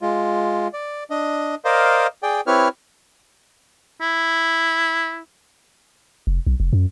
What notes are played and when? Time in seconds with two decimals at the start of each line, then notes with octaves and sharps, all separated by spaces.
0.02 G#3 F4
0.73 D5
1.10 D4 D#5
1.65 A#4 C5 D5 D#5 F5
2.23 G#4 D5 G5
2.47 C4 E4 G4 B4 C#5 F6
4.01 E4
6.27 F1
6.47 B1
6.60 F1
6.73 F#2